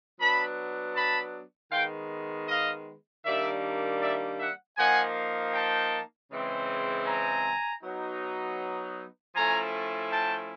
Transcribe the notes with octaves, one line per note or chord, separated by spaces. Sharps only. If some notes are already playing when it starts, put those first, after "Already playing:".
F#3 B3 D4 A5 B5
A5 B5
D#3 G#3 B3 F5 G5
D#5 F5
D#3 G3 A#3 D4 D5 E5
D5 E5
E5 F#5
F3 A#3 D#4 F#5 G#5
G5 A5
C#3 E3 G#3 C4
G#5 A#5
F#3 B3 D#4
F3 A3 C#4 E4 G#5 A#5
G5 A5